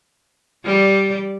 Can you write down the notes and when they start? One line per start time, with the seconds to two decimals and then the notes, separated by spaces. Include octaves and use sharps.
0.65 G3 D5